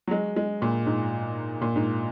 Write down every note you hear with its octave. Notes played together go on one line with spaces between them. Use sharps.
F#3
G#3
G#3
A#2
G#2
A#2
G#2